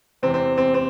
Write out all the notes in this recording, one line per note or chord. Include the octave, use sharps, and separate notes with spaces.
E2 C3 E3 C4
C4
C4
C4